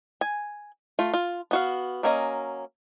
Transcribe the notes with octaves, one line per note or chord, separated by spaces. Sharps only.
G#5
A3 F4
F4
B3 F#4 F5
F#3 A#3 C#4 D4 D#5